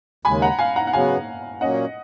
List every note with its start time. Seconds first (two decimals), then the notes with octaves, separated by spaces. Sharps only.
0.25 D#2 C#3 G#3 G#5 B5
0.42 F#5 A#5
0.59 F5 G#5
0.76 F#5 A#5
0.87 F#5
0.93 C#3 F#3 B3 F5 G#5
1.61 A#2 F#3 A#3 C#4 D#5 F#5